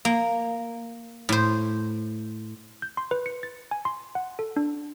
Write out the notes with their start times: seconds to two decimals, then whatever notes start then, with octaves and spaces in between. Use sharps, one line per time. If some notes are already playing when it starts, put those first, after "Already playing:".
0.05 A#3
1.29 A2 C5
2.82 G6
2.97 C6
3.11 B4
3.26 C#7
3.43 A6
3.71 G#5
3.85 C6
4.15 F#5
4.39 A4
4.56 D4